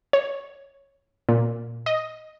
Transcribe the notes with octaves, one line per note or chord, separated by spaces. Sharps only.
C#5
A#2
D#5